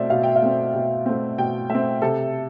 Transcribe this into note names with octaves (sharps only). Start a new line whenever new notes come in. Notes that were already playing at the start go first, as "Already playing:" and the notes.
Already playing: B2 A3 C4 D5 E5
B2 F5
G5
F5
A3 C4
B2
A3 C4
B2 G5
A3 C4 E5
C3 A4